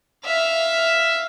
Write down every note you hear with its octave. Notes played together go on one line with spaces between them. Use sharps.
E5 F5